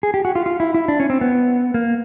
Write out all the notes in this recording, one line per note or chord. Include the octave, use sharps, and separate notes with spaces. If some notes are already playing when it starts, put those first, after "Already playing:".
G#4
G4
F#4
F4
F4
E4
E4
D4
C#4
C4
B3
A#3